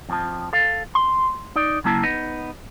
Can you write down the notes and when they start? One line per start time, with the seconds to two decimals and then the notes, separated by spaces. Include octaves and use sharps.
0.09 F2 F3 A5
0.53 A4 F5
0.95 C6
1.56 D#4 D5
1.84 C#3 F#3 A#3 E4 A5
2.03 B3 D#4